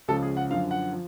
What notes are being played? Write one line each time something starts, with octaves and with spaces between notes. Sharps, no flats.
C#2 C#3 F3 A4
G#4
F#5
F#2 D3 F3 F5
F#5
F3